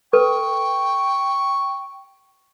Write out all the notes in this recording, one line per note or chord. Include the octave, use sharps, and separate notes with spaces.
A4 B4 G5 C#6